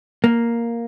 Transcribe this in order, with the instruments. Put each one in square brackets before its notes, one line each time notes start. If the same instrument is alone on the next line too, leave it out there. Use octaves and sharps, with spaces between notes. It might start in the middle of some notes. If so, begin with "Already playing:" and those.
[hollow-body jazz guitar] A#3